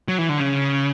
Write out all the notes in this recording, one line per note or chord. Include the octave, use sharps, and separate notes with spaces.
F#3
E3
D3
C#3